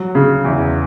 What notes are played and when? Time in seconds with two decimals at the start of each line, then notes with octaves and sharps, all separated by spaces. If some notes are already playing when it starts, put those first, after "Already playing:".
Already playing: F#3
0.15 C#3
0.44 E2